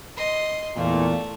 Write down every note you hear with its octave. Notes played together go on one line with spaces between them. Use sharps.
D#5 C6
E2 A#2 A3